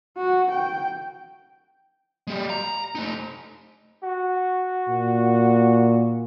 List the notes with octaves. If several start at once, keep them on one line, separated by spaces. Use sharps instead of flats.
F#4
G5
G#3 G4
A#5
A3 D#4
F#4
A#2